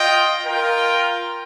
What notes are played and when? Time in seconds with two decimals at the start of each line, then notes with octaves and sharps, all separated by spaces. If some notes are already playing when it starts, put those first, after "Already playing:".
Already playing: F4 D#5 G5
0.44 F4 A#4 G5